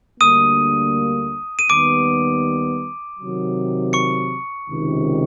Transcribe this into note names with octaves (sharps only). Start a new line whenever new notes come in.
D2 D3 G3 A#3 D#6 D#7
D#7
D#2 D#3 G3 B3 D6 D7
C3 D#3 F#3
C#6 C#7
C#2 C3 D#3